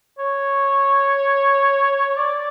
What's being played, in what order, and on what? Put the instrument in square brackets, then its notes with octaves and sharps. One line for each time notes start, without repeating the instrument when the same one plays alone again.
[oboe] C#5
D5